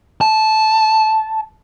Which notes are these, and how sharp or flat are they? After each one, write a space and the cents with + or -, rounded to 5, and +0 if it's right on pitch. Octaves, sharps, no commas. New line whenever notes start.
A5 -10